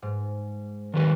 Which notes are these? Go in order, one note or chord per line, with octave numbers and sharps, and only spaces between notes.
G#2
D#3 G3 B4